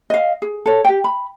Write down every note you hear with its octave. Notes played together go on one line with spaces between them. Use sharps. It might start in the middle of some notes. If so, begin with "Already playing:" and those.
D#5 F5
G#4
A4 C#5
G4 G5
B5